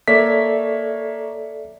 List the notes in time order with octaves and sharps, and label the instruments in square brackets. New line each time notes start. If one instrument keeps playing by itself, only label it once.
[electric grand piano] A#3 C#5 B6 [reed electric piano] A4 D5 E5